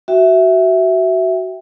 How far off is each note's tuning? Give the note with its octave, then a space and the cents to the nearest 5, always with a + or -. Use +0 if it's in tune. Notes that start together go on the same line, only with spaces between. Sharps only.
F#4 +20 E5 +0 G5 +0